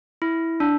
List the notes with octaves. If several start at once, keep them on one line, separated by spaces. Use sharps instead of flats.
E4
D4